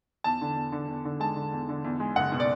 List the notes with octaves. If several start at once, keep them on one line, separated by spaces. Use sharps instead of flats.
E2 A5
D3
E2
D3
E2
D3
G#3 A5
D3
E2
D3
E2
G#3
F#1 F#5
B2
D5